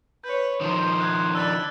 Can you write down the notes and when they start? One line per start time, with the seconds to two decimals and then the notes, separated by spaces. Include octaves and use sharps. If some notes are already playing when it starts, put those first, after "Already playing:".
0.24 B4 C#5 G6
0.61 D#3 F3 C5
1.01 F#6 G#6
1.35 D4 B5 E6 F#6 A6